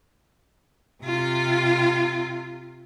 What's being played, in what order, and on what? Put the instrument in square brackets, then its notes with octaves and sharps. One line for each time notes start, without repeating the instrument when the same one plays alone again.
[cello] C3 F4